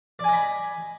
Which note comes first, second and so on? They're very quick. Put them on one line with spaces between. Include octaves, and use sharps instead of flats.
D5 G#5 D#5 B5